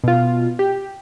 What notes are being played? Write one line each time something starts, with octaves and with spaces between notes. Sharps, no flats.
B2 F4
G4